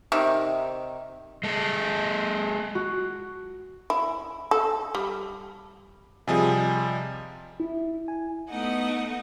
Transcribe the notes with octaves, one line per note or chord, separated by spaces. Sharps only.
C3 D#3
G#3 A4
F#4
E4
A4
G3
C3 F3 G3 G#4 D#5 G#5
E4
G#5
A3 B3 D#4 D#5 F#5